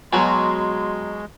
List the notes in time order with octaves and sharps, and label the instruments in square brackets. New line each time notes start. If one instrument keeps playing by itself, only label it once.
[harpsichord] B2 F#3 [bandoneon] G#3 [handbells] G#5 A#5 [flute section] C6